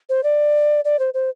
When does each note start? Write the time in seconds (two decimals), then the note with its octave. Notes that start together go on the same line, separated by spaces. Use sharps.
0.09 C5
0.23 D5
0.85 D5
0.99 C5
1.14 C5